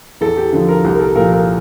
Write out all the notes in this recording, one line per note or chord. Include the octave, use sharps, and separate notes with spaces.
E2 A4
G4
D3 F3 A4
A#4
C2
A#4
A4
A#2 F3 A#4
A#4